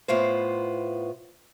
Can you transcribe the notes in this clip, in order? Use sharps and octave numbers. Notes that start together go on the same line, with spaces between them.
A2 B3 F4 C5